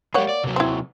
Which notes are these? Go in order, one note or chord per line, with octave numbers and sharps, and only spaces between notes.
G#3 A#3 G4 C#5 F#5
D5
C3 F#3
C4 E4